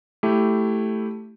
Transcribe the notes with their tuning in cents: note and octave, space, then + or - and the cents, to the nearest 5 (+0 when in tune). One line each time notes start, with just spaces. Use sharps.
A3 +0 E4 +0 G4 -5